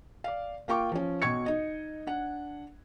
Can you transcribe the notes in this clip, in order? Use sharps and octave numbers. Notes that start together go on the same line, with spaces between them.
D5 F5
A#3 F4 G5 C#6 D6
F3 C#4
B1 B2 C#6 G#6 C#7
D#4 D#5
D4 F#5